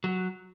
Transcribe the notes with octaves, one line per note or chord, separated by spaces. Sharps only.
F#3